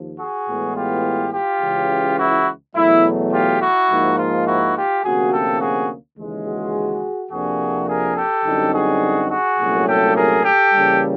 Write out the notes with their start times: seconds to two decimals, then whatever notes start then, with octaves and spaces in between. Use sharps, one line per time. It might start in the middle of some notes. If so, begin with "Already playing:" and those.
Already playing: D#2 F3
0.19 F#4 G#4
0.48 A2 E3 G#3 B3
0.76 F4 G4
1.33 F4 G4
1.62 C#2 C#3 E3
2.18 E4 F#4
2.75 E2 B2 F#3 A3 E4
3.33 F4 G4
3.61 E4 F#4
3.90 G#2 F3 A#3 D#4
4.18 F4
4.46 E4 F#4
4.75 F4 G4
5.03 D2 C3 F3 A#3 C#4 F#4 G#4
5.32 G4 A4
5.60 F#4 G#4
6.17 D#2 C#3 E3 G#3
6.46 F#4 G#4
7.31 F2 C3 F3 A#3 D4 F#4 G#4
7.88 G#4 A#4
8.16 G4 A4
8.45 F#2 D3 G3 C4 D#4
8.74 F#4 G#4
9.30 F#4 G#4
9.59 C2 A#2 F#3 A3 C#4
9.87 G4 A4
10.16 G#4 A#4
10.44 G4 A4
10.73 C#3 E3 G3 A#3